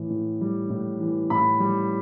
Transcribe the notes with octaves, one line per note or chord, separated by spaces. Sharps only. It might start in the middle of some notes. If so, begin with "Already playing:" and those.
Already playing: A2 E3
A2
G3
A2
E3
A2 B5
G3